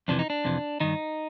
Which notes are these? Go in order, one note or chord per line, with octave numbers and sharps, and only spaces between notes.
F2 C3 E3 D4
D#4
D4
F2 C3 E3
G2 D#3 D#4